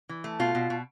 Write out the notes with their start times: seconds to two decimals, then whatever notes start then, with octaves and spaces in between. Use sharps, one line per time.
0.09 E3
0.24 A3
0.39 B2 F4
0.55 B2
0.70 B2